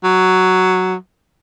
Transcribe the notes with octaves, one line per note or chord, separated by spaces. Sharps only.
F#3